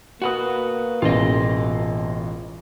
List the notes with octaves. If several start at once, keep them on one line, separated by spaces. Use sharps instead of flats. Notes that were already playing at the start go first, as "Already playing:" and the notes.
A#3 F#4 B4 F#5 D#6
E1 A1 F4 D#5